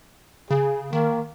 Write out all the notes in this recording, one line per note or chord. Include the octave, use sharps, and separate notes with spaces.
C#3 G#4
D#3 A#3